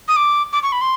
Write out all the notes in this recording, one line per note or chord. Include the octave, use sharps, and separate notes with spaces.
D#6
D6
D6
C#6
B5
C6